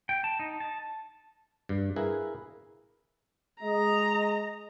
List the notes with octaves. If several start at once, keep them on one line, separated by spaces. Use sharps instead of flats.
G5
A5
D#4
A5
G2
E4 G#4 A#4 B4 F5
G#3 D#5 A#5